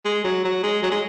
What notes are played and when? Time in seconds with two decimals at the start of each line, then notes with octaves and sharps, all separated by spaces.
0.05 G#3
0.24 F#3
0.45 F#3
0.63 G#3
0.83 F#3
0.91 G#3